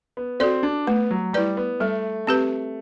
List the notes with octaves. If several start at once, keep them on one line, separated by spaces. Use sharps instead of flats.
B3
C4 F#4 A4 D5
D4
A3 B3
F#3
G3 E4 B4 D5
B3
G3 A3
C4 G4 B4